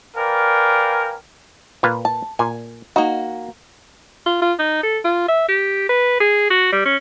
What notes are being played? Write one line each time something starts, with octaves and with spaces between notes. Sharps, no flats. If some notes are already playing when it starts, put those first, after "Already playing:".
A#4 B4 D5 F5 G5 G#5
A#2 B4 F5
A5
A#2 G#5
A#3 D#4 F#4
F4
F4
D#4
A4
F4
E5
G4
B4
G#4
F#4
G3
C#4